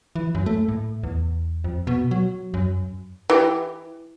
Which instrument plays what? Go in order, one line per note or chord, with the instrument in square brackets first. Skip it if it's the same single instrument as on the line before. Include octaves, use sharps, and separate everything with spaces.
[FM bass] E3
F#2
A3
A2
E2
F2
B2
F#3
F#2
[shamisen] E3 G4